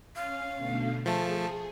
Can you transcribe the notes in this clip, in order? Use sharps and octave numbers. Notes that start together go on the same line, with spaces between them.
C#4 F5
B2 D3 A3
F3 A3 G#4 A5